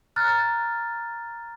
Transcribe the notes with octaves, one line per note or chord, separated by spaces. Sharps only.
A#5 F6 F#6 A6